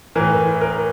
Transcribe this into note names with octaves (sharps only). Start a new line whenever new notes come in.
A2 E3 A#4
A#4